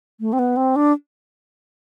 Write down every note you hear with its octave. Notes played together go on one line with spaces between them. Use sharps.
A3
C4
B3
C4
D4